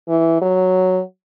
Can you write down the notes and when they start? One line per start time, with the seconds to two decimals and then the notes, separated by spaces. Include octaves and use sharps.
0.09 E3
0.42 F#3